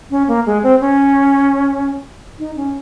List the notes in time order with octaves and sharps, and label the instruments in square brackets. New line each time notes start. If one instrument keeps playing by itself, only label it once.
[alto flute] C#4
A#3
G#3
C4
C#4
D#4
C#4